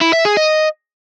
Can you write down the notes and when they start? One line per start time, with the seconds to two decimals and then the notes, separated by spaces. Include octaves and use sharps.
0.01 E4
0.13 E5
0.25 G#4
0.37 D#5